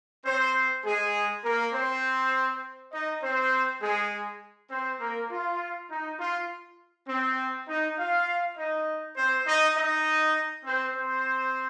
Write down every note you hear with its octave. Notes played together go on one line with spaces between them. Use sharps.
C4 C5
G#3 G#4
A#3 A#4
C4 C5
D#4 D#5
C4 C5
G#3 G#4
C4 C5
A#3 A#4
F4
D#4
F4
C4
D#4
F4 F5
D#4 D#5
C4 C5
D#4 D#5
D#4 D#5
C4 C5
C4 C5